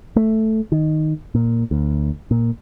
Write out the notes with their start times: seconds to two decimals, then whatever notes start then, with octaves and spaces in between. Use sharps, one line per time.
0.16 A3
0.72 D#3
1.35 A#2
1.71 D2
2.31 A#2